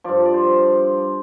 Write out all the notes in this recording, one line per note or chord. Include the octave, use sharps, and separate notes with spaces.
G2 F3 D5
D5
C5